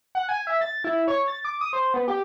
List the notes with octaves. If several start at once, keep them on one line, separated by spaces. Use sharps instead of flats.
F#5
G#5
E5
A6
E4
C#5
A6
D6
D#6
C5
B3
G4